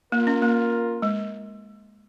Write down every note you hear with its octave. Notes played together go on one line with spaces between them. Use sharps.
A#3 F4 A#4 F5
C#4
A#3
G#3